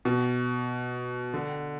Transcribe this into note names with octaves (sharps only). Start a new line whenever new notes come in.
B2
D3